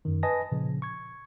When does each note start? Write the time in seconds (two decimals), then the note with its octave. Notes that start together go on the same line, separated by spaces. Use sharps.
0.05 F#2 D#3
0.23 B4 D#5 G#5 A5 D#6 A#6
0.52 A#2 C#3 F3
0.82 C#6 G#6